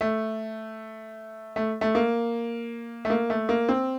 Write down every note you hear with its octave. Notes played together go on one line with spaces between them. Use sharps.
A3
A3
A3
A#3
A3
A#3
A3
A#3
C4